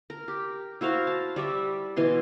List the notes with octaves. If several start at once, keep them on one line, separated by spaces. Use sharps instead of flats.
A#4
G4
E4 F#4 C5 F5
A5
G3 D5 E5
B2 E3 G#5 C6